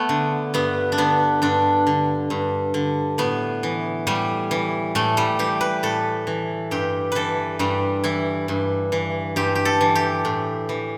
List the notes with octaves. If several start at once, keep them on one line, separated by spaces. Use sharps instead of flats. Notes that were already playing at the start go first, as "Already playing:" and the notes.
Already playing: A3 B3
D3
G2 B3
D4
D3 B3
G2 D4
D3
G2
D3
A2 B3
E3
A2 G3
E3
A2 A3
G3
E3 G4
B4
A2 A4
E3
G2 G4
E3 A4 B4
G2 G3
E3 E4
G2
E3
G2 G4
G4
A4
E3
G4
A2
E3